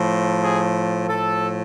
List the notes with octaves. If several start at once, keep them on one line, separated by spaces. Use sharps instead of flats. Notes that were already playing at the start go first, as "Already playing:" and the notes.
Already playing: A2 F3
G#4
A2 F3 A4